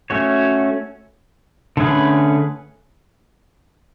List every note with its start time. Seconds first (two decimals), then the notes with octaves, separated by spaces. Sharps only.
0.10 A3 C#4 F#4 C#5
1.77 D3 A3 C#4 G#4 B4